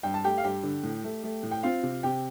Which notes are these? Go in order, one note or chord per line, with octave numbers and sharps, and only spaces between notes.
G2 G5
A5
A3 G4 G5
F5
G2 G4 G5
D3
A2
A3
A3
A2
G5
C4 F4 F5
C3
C3 G4 G5